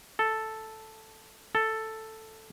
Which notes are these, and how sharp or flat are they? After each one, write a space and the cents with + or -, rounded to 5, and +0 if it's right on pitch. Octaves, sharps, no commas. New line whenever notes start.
A4 +0
A4 +5